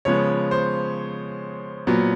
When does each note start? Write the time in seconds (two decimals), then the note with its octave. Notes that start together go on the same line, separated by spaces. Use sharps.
0.05 C#3 F3 G#3 B3 C#5
0.51 C5
1.87 A#2 F#3 B3